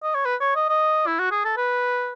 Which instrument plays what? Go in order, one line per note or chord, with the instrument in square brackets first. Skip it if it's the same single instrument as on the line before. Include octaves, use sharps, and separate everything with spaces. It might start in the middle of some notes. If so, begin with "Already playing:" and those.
[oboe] D#5
C#5
B4
C#5
D#5
D#5
E4
F#4
G#4
A4
B4